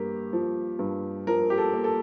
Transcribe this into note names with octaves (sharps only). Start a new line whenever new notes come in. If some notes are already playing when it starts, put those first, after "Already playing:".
Already playing: G2 A#3 G4
F3
G2
F3 A#4
G4
A4
A#3
A4